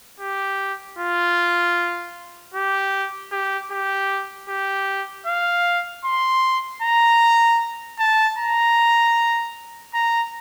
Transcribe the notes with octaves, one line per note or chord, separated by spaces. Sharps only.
G4
F4
G4
G4
G4
G4
F5
C6
A#5
A5
A#5
A#5